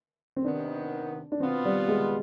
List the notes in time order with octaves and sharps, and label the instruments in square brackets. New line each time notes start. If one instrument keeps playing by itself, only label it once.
[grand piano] C4
[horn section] C3 D#3 B3 [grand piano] D4
[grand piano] D4
[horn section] B2 B3 F4 [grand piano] C4
[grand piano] G3
G#3